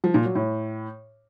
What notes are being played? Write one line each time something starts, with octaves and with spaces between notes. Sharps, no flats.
F3
A#2
F#3
A2